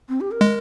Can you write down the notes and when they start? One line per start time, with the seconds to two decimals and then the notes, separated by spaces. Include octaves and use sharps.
0.09 C4
0.21 G4
0.31 A#4
0.41 G#3